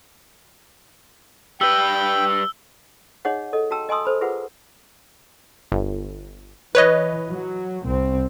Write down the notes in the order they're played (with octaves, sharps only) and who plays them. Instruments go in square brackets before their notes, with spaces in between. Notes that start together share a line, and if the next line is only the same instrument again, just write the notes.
[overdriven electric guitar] G3 B4 [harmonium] G5 [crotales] E6 G7
[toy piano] D#4 G#4 C#5 D#5 F#5
A4 D#5
F#4 G5 A5 A#5 E6
D#5 G#5 A5 C6 D#6 E6
A4 C5 B5
F4 G#4 B4 C5 F#5
[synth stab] G1
[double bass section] E3 [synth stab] B4 C#5 D#5
[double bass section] F#3
C2 C4